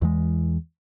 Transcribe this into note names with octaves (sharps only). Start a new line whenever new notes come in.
E2 E3 G#3